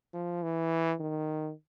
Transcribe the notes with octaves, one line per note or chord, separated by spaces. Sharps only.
F3
E3
D#3